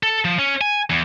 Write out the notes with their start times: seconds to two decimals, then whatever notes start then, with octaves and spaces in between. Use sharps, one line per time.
0.03 A4
0.25 F3
0.39 C#4
0.61 G#5
0.90 E2